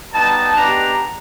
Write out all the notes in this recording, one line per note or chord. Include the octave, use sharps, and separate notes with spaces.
G3 B3 D#4 A5
G#3 B3 D4 G4 A#5